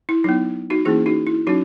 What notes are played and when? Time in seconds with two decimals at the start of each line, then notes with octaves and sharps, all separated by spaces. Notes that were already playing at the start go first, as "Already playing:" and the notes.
0.09 E4
0.24 F#3 B3 D#4
0.70 D#4 F#4
0.85 E3 A#3 C#4 E4 G#4
1.06 D#4 F#4
1.27 E4
1.47 F#3 C#4 D#4 F#4